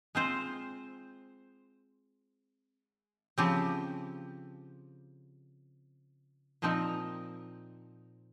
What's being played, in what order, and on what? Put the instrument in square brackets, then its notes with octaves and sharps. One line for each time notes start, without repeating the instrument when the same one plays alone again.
[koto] G#3 C4 F4 C5
C#3 F3 C4 G4
A#2 F3 C4 D#4 A#4